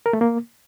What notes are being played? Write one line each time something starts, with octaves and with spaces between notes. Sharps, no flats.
A#4
A3
A#3